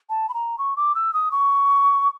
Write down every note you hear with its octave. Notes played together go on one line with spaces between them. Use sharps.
A5
B5
A#5
C#6
D6
E6
D#6
C#6